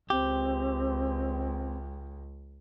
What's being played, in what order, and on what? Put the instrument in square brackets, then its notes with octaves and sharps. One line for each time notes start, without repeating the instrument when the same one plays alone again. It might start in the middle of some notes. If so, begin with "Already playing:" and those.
[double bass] C#2 [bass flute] C4 [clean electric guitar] G4